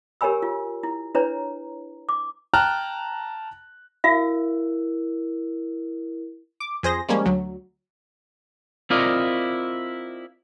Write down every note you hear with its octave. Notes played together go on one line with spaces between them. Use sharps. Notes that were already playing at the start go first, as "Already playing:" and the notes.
G4 A#4 C#5 G#5 B5 E6
F4
E4
D4 E4 B4 C#5 A#5
D6
G5 A5 A#5 F6 F#6
E4 F#4 A#4 E5 F5
D6
F2 G#4 C5 A#6
F3 G3 G#3 A#3 C#4
D2 F#3
C4 E4 F4 A#4 D5 D#5